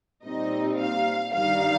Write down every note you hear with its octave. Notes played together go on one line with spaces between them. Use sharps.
A#2 G3 C4 D#4 D#5
F5
G2 D#3 G3 D#4 F5